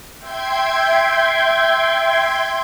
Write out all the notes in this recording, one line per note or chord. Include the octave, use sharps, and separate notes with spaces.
E5 G5 C6 G6 G#6